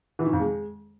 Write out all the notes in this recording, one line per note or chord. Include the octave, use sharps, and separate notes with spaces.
E3
D#3
F2
G#3